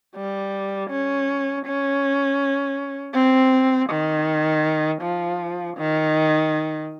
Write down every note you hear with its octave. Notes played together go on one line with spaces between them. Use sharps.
G3
C#4
C#4
C4
D#3
F3
D#3